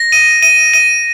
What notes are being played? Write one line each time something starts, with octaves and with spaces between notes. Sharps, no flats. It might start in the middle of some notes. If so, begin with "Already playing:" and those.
Already playing: A#6
D#7
D#7
D#7